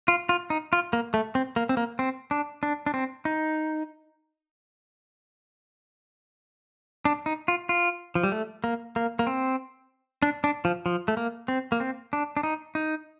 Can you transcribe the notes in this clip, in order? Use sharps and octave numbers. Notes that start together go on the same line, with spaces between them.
F4
F4
D#4
F4
A#3
A3
C4
A#3
C4
A#3
C4
D4
D4
D4
C4
D#4
D4
D#4
F4
F4
F3
G3
A3
A#3
A#3
A#3
C4
D4
D4
F3
F3
A3
A#3
C4
A#3
C4
D4
D4
D#4
D#4